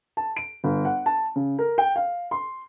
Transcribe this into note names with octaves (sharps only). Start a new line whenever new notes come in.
A5
D7
G1
F#5
A5
C#3
A#4
G5
F5
C6